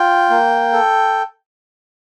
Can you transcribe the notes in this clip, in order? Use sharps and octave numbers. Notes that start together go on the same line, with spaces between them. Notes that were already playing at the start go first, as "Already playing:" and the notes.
Already playing: F4 G5
A#3
A4